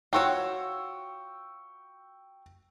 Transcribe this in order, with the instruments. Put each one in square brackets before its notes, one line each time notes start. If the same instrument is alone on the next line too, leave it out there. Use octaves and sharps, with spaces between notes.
[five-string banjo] F4 F#4 C#5 [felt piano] G5 C#6 E6